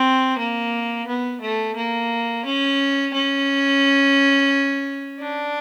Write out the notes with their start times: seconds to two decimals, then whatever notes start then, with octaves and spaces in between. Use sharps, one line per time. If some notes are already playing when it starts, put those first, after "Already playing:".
Already playing: C4
0.38 A#3
1.07 B3
1.41 A3
1.76 A#3
2.45 C#4
3.14 C#4
5.20 D4